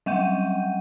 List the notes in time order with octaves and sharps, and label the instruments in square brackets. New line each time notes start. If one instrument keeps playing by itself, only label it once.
[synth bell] F#3 G3 F#5 G5 G6 D#7